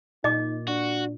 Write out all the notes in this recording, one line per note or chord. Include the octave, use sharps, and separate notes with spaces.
A#2 D#4 D#5 D6
D4 F#4